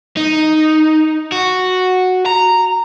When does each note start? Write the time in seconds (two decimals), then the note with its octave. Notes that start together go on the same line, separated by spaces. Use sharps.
0.17 D#4
1.32 F#4
2.26 A#5